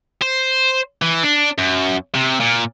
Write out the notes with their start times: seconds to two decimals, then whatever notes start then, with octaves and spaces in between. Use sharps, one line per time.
0.22 C5
1.02 E3
1.23 D4
1.58 F#2
2.15 C3
2.40 A#2